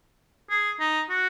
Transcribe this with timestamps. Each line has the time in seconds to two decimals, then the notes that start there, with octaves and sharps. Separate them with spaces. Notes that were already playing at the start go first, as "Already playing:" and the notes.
0.50 G#4
0.80 D#4
1.10 F#4